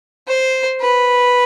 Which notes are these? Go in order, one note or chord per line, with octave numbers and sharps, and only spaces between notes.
C5
B4